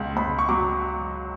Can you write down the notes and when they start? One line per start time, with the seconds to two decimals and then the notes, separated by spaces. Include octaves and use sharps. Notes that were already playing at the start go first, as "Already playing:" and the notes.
Already playing: C#2 B2
0.17 C#2 B5
0.39 C#6
0.49 F#3 D6